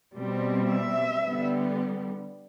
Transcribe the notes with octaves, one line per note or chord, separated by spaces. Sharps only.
B2 G3 C4
E5
D3 G3 B3